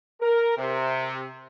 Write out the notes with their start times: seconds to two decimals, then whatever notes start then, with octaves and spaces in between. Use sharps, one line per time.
0.21 A#4
0.58 C3